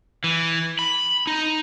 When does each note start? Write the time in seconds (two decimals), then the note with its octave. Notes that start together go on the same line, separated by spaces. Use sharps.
0.24 E3
0.79 B5
1.27 D#4